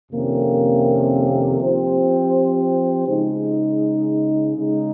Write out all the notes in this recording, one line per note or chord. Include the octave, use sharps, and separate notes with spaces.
F2 C3 D#3 A#3 C#4
F3 C4 G4 C5
C#3 G#3 D#4
C#3 G#3 D#4